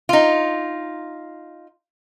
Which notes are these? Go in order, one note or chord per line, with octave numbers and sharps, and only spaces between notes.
D#4 F4